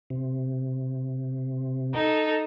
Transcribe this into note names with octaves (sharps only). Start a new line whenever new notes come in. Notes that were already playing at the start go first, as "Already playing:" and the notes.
C3
D#4 A4